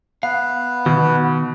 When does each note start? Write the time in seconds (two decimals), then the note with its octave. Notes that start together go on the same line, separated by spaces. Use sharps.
0.23 B3 B4 F5
0.86 B2 D#3